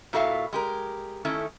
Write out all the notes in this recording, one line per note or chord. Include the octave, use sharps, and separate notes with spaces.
A#2 E4 F#4 A4 E5 F5
G#3 G4 A#4
D#3 A3 C#4 E4 A4